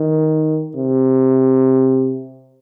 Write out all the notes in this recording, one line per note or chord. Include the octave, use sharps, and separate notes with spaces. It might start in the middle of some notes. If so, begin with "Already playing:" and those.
Already playing: D#3
C3